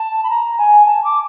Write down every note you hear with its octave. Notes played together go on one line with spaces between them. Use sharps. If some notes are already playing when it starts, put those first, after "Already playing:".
Already playing: A5
B5
A#5
G#5
A5
D6